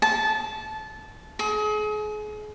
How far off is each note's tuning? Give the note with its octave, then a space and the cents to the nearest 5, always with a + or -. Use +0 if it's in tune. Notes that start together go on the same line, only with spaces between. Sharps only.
A5 -20
G#4 +35